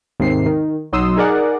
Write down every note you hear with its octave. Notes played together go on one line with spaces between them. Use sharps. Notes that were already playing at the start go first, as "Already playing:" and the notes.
D#2 G#2 C3 C7
D#3
B1 F#3 D#4 C6 D#6 E6
D#4 G#4 A#4 D5 F#5